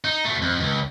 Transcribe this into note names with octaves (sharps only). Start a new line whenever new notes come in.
D#4
B2 A3
F2
C#2